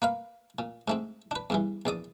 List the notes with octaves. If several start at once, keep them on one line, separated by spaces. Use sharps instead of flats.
A#3 B4 F5
A#2
G#2 A3 C4
D4 B4
E2 G2 E3
A#1 E2 D5 D#6